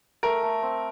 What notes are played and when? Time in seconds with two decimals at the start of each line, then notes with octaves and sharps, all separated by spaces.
0.23 A3 A#4
0.43 A3
0.62 C4